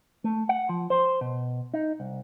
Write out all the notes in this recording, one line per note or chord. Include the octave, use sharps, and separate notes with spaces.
A3
F#5
F3
C5
B2
D#4
C2